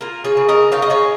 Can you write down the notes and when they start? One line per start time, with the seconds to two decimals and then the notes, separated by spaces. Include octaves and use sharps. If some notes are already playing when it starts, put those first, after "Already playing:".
0.01 A#3 F4 A#4
0.24 G#4 C#5
0.37 C#3
0.49 A#4 D#5
0.72 D#4 C#5 F5
0.82 D#5
0.90 G#4 C#5